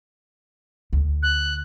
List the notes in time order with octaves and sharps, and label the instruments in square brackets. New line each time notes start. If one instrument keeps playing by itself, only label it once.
[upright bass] D2
[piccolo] F#6